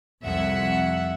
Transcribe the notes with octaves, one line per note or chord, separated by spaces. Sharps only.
C2 F2 E5 F#5